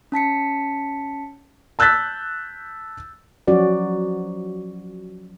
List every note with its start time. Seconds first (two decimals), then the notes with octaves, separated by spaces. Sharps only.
0.12 C#4 A5 B6 C#7
1.79 A5 E6 F#6 G6 A6 B6
3.47 F3 F#3 C#4 F#4 D5